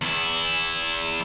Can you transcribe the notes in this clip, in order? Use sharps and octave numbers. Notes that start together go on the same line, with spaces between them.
E2 E4